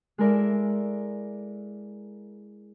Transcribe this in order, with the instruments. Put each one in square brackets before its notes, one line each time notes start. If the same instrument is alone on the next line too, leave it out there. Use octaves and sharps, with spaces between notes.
[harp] G#3 E4 A4 A#4 D5 E5